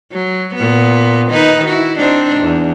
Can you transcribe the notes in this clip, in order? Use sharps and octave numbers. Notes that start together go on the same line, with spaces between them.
F#3
A#2 B3
D#3 D#4 B4
E4 F#4
C4 D4 D#4
E2